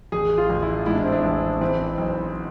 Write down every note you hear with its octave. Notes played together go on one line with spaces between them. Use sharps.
A1 G#4
F4
A1
E4
G#2 E4
D4
C4
D4
A1
E3 C4
B1